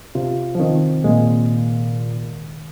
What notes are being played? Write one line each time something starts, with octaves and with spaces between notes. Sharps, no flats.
C3 F4
F3
D#3 C4
A#2 G#3